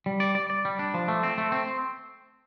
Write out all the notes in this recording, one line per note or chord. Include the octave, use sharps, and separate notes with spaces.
G3
D5
D5
D5
G3
D4
F3
A3
C4
A3
C4